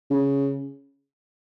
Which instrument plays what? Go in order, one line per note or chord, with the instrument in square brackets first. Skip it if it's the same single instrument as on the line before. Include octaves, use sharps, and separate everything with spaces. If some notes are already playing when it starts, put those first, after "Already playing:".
[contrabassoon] C#3